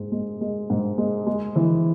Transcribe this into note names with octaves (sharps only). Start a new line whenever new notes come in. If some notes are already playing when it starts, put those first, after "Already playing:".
Already playing: G#2 G#3
G#3
G#3
G#2
G#3
G#3
E3